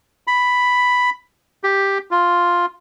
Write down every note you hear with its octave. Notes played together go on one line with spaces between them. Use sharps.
B5
G4
F4